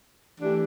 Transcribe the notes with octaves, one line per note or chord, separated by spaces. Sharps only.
E3 A3 D4 G4